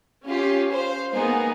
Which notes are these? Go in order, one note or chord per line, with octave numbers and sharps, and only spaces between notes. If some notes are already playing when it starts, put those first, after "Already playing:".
C#4 F4 G4
C5 F5
G#3 A#3 B3 D#4 G#4